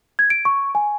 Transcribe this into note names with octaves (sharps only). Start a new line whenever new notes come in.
G#6
D7
C#6
G#5